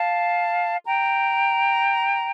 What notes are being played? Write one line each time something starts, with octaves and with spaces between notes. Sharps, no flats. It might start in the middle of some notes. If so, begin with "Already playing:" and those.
Already playing: F5 A5
G5 A#5